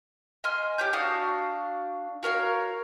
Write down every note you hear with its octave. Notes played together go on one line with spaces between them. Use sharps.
D#5 G#5 C6 F6
G4 C#5 D6 G6
D4 F#4 F5 D#6
F#4 A#4 C#5 F5